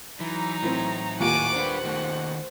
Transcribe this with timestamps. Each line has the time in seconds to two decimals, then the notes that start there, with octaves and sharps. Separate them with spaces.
0.20 E3 F#3 D#4 A#5
0.63 A2 E3 C4
1.20 D#2 A#2 F#5 G#5 D6 D7
1.56 D4 B4 C5
1.85 D#3 A3